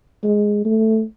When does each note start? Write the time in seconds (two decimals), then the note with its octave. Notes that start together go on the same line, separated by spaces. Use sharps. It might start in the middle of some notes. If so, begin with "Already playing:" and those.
0.23 G#3
0.65 A3